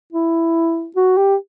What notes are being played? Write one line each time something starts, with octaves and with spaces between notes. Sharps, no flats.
E4
F#4
G4